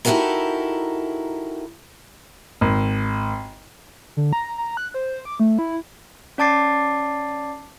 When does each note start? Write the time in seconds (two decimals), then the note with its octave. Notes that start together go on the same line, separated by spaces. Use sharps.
0.05 D#4 E4 F#4 G4 A4 A#4
2.61 G#1
4.17 D3
4.33 A#5
4.58 A#5
4.77 F#6
4.94 C5
5.25 D6
5.40 A3
5.59 E4
6.38 C#4 D5 A5 D6 A6 C7